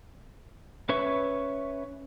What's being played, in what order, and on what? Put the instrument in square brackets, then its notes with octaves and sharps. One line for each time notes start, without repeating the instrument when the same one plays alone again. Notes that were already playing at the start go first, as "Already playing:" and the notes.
[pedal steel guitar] C#4 B4 C#5 E5 C#6